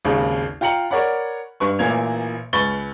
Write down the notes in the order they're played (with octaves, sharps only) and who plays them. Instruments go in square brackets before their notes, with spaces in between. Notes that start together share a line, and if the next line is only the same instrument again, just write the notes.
[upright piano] G#1 D#2 C#3
F4 G5 A#5 C#7 F#7
A#4 C#5 D5 F#5 B5
G2 B4 C#6
A1 A#2 E3 A#3 G#6 F7
C#2 B4 B5 C#6 A6 G7